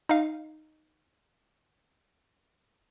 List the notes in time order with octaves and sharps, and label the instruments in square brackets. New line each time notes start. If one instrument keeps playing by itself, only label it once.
[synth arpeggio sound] D#4 F5